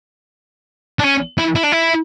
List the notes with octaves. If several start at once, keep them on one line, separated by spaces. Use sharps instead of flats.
D4
C#4
E4
E4
D4
E4